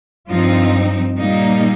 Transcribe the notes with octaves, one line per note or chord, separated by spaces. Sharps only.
G2 F3 C4 D#4 F4
A#2 G3 A#3 D#4